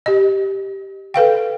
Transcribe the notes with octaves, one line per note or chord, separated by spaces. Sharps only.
G4 D#5
A4 B4 F5 G5